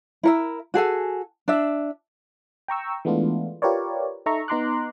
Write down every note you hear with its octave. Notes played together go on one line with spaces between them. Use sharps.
E4 A#4 E5
F#4 G#4 A4 G#5
D4 E5
G5 A#5 C#6 E6
E3 G#3 A3 B3 D4 F4
F4 G4 A#4 B4 C#5 D5
D#4 A4 E5 A#5 C#6
B3 D#4 A#5 C6 D6 F#6